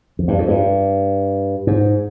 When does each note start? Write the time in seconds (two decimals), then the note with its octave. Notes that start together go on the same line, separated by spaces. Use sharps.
0.19 F2
0.28 G2
0.38 F2
0.48 G2
1.67 G#2